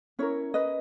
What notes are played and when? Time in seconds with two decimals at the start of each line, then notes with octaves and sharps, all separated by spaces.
0.19 C#4 E4 A#4 C#5
0.54 B4 D#5